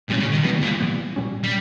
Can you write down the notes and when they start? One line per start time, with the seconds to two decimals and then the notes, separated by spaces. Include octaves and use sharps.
0.09 A#2 D#3 G3 A#3 C#4
0.21 C#3
0.32 D#3
0.44 B2 E3 G3 B3
0.63 A#2
0.80 E3 G3 B3
1.16 A#2 G3 C#4
1.44 G3